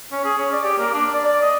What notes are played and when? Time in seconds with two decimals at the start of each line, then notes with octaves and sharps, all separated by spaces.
0.12 C#4
0.24 G#4
0.38 C#4
0.52 D5
0.64 G4
0.78 A#3
0.94 D4
1.13 D5
1.25 D5
1.42 D#5